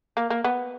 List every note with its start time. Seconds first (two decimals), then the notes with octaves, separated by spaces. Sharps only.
0.17 A#3
0.30 A#3
0.44 B3